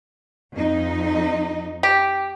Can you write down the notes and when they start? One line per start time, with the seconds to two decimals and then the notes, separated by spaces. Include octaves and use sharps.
0.55 F2 D#4
1.83 G4